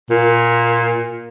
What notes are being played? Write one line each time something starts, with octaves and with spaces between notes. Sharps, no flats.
A#2